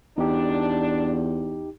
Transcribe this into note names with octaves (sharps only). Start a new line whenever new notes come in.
E2 D4 D#4 G4